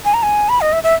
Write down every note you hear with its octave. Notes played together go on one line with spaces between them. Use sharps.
G#5
A#5
G#5
B5
D#5
E5
E5